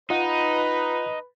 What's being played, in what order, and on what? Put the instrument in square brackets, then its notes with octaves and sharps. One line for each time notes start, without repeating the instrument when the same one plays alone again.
[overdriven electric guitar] D#4 [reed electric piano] F4 D#5 F#5 [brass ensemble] B4